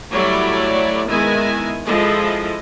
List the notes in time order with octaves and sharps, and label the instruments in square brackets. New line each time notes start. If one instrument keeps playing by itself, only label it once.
[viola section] F#3 G3 A3 E4 C#5 D5
D#3 G#3 B3 E4 E5 G#5
F3 G#3 E4 A4 D#5